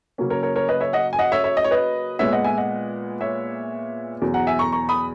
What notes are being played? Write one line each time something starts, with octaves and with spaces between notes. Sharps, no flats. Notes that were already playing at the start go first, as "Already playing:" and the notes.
C#3 F#3 A#3 C#4
A#4 C#5
A#4 C#5
A#4 C#5
B4 D#5
C#5 E5
D#5 F#5
G#5
D#5 F#5
C#5 E5
C#5 E5
D#5
C#5
B4 D#5
A#2 G#3 B3 C#5 E5
D#5 F#5
E5 G#5
D#5 F#5
C#5 E5
E2 B2 F#3
F#5 A#5
E5 G#5
A#5 C#6
A#5 C#6
B5 D#6